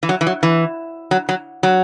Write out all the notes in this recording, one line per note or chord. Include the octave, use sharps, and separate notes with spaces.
E3
F#3
E3
F#3
E3
F#3
F#3
F#3